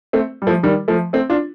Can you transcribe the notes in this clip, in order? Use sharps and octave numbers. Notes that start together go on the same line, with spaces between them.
A3 C4
G3
F3 A3
D#3 G3
F3 A3
A3 C4
D4 F4